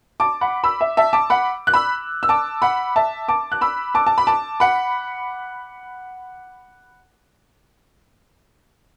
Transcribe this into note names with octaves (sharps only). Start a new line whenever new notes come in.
A5 D6
F#5 B5
B5 E6
E5
E5 A5
A5 D6
F#5 B5
F#6
B5 E6
E6
A5 D6
F#5 B5
E5 A5
A5 D6
F#6
B5 E6
A5 D6
A5
B5
A5 D6
F#5 B5